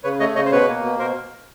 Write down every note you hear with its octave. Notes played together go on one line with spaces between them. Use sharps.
C#3 B4 C#5
A3 C#5 D#5
C#3 C#5 D#5
C5
B2 B4 C#5
A#3
B2
B2 A#4 C5